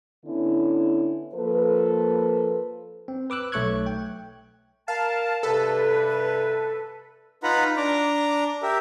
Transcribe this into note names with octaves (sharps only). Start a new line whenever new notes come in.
D3 B3 C#4 E4
F3 A#3 A4 B4
C4
B4 D6 E6 F#6
B1 A3 C#5 C#6 F#6 G#6
G5
A#4 F5 A5
G2 C3 A4 B4
D#4 F4 B4 F#5 A#5 B5
D4 A#5 D6
G4 A#4 E5